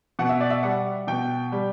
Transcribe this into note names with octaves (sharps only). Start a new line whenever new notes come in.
B2 F#5
E5
D5
E5
G3 F#5
B2 G5
G3